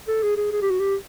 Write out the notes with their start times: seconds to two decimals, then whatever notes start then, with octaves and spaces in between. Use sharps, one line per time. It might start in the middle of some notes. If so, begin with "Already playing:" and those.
0.08 A4
0.23 G#4
0.37 G#4
0.53 G#4
0.62 G4
0.70 F#4
0.80 G4